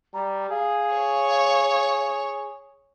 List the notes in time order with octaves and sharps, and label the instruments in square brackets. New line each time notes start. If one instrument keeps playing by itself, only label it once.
[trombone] G3 [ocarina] A#5
[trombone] G#4 [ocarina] F5
[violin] C#5